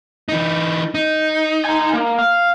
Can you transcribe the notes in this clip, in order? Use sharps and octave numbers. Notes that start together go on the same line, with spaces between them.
E3 D#4
D#4
G#5 A#5
A#3
F5